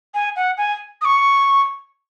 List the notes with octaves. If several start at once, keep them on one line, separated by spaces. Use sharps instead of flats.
G#5
F#5
G#5
D#6
C#6